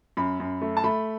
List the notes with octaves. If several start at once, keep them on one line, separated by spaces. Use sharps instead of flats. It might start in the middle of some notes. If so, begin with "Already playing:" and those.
F#2 B5
F#2
A3
A5
A3 B5